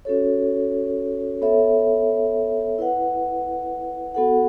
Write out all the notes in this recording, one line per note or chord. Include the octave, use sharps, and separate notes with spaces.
C#4 F#4 A4 C#5
B3 A4 C#5 E5
E4 B4 F#5
B3 F#4 A4 F#5